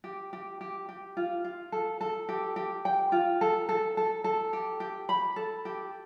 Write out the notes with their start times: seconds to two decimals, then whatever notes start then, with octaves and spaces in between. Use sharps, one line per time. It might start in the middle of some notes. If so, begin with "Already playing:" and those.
0.04 G4
0.33 G4
0.61 G4
0.89 G4
1.17 F4
1.44 F4
1.72 A4
2.01 A4
2.29 G4
2.56 G4
2.85 G5
3.12 F4
3.41 A4
3.69 A4
3.97 A4
4.24 A4
4.53 G4
4.80 G4
5.09 B5
5.36 A4
5.65 G4